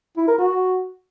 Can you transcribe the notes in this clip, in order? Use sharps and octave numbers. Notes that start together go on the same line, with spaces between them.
E4
A#4
F#4